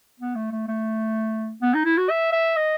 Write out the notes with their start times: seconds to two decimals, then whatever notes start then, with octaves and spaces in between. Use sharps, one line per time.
0.20 B3
0.35 A3
0.52 A3
0.68 A3
1.62 B3
1.74 D#4
1.85 E4
1.97 F#4
2.10 E5
2.32 E5
2.56 D#5